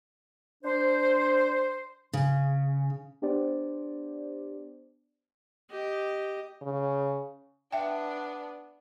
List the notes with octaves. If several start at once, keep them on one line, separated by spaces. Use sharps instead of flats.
D4 C5
C#3
B3 D4 G4 C5 D5
G4 D#5
C#3
B3 D4 E5 G5